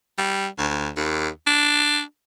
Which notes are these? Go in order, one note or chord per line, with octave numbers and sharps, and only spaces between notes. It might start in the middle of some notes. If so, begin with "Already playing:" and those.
G3
D2
D#2
D4